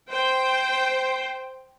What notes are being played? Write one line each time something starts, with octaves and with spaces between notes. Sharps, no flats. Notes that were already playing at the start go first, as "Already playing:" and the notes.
C5 G5